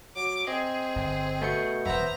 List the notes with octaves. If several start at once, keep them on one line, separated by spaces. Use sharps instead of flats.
F#3 D6
C4 G#4 D#5
G1
B2 A3 G6 C#7
D#1 F#2 B3 C5 E5 A#5